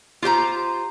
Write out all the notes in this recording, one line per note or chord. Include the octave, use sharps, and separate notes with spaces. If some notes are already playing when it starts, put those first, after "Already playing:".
F4 G4 C5 A#5